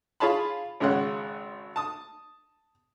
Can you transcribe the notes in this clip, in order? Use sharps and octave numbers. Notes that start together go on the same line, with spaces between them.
F4 G#4 C#5 A5 B5
G#1 C#3 G#3 C#4 F#5
A5 D#6